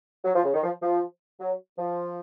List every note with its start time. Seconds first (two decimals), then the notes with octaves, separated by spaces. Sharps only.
0.25 F#3
0.35 F3
0.44 C#3
0.54 D#3
0.63 F3
0.82 F3
1.40 F#3
1.78 F3